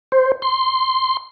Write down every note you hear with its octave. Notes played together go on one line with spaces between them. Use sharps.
C5
C6